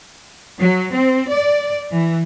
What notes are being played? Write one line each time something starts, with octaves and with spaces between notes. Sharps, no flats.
F#3
C4
D5
E3